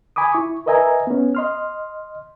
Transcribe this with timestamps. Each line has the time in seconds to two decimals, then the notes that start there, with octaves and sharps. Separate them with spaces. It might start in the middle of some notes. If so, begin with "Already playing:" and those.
0.16 G#5 B5 D6 D#6
0.33 E4 C#6
0.66 A#4 B4 D#5 E5 G#5 A#5
1.07 B3 C#4
1.35 D#5 C6 F6